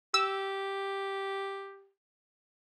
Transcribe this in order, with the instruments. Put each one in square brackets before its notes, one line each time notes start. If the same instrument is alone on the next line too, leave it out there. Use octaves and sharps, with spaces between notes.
[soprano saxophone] G4 [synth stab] E6